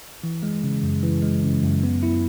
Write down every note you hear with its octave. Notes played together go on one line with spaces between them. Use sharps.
E3
G#3
C#3
F#2
E3
G#3
C#3
F#2
B3
E4